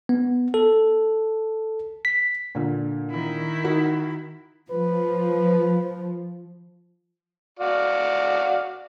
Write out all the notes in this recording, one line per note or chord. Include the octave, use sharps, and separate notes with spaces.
B3
A4
B6
A#2 D3
D#3 E4
D#4 F#4 A#4
F3 B4
F#4 D5 F5